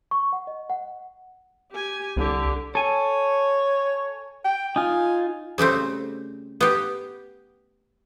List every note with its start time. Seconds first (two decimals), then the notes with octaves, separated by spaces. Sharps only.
0.11 C#6
0.33 F#5
0.47 D#5
0.70 F#5
1.72 G4 G#5
2.17 C2 D3 G4
2.75 A4 C#5 G#5
4.44 G5
4.76 D#4 F4 G#5
5.58 C#3 G3 A3 C4
6.61 B3 G4